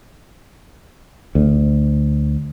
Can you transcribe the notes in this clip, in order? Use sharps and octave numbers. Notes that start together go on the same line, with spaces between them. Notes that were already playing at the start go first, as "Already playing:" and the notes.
D2